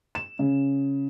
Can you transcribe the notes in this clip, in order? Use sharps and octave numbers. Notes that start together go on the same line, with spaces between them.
E7
C#3